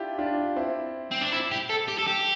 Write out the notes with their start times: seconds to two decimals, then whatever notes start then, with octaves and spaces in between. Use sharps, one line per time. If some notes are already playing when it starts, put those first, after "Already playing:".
Already playing: D4 E4 F4 G4
0.18 D4 F4
0.56 C4 E4
1.11 C4
1.21 D4
1.32 E4
1.51 G4
1.69 A4
1.88 G4
1.98 A4
2.07 G4